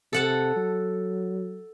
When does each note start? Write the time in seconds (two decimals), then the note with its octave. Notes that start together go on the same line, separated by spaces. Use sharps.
0.13 C3 A4 F#5 A5
0.56 F#3